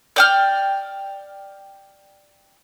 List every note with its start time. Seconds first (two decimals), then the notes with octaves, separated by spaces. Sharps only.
0.16 D5 G5 F6